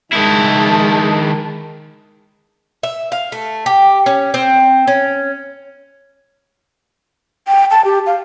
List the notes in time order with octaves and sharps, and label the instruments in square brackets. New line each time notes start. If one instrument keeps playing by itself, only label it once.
[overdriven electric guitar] D#3 E4 [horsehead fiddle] G#3 A5
[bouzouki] E5
F5
A3
G4
C#4
C4
C#4
[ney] G5
A5
G4
F5